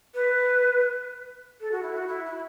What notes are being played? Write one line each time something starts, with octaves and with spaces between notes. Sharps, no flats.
B4
A4
F#4
E4
F#4
E4
E4